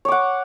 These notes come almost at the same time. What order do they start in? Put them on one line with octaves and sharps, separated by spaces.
C#5 D6 F#5